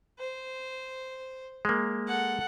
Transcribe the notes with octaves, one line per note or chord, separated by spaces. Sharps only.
C5
G#3 A#3
A4 F#5